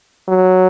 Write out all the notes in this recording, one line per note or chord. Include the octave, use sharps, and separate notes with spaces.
F#3